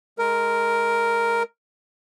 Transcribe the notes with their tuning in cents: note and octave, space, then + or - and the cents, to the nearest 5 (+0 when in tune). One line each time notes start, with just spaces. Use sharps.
G#3 +20 A#4 +0